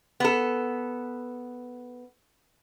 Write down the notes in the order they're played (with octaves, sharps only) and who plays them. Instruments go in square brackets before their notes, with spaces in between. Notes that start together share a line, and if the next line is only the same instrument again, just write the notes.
[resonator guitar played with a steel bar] B3 A4